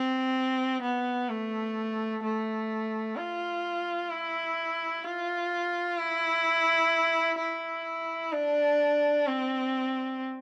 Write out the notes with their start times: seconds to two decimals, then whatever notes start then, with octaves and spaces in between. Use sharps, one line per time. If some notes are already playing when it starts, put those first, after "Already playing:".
Already playing: C4
0.82 B3
1.29 A3
2.23 A3
3.17 F4
4.10 E4
5.04 F4
5.98 E4
7.39 E4
8.32 D4
9.27 C4